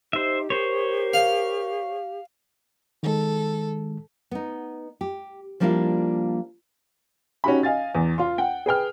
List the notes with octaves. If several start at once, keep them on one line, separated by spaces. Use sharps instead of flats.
D#4 G4 C5 E5
A#4 C5 C#5
F5
D#3 G#3 A4
B3 D#4
G4
F3 G3 A#3 D4 E4 F4
C#4 D#4 F#4 G4 B5
D#5 F5 G#5 A6
E2
F4 C6
F#5 G5
G#4 B4 G5 F6